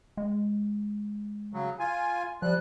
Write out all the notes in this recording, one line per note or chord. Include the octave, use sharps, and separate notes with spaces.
G#3
C#3 F#3
F4 G#5
F3 G3 F#6